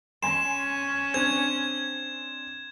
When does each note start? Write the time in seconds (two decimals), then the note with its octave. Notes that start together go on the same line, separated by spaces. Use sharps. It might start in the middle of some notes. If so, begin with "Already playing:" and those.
0.23 C#4 G#5 C6 E7
1.14 C4 D4 G#6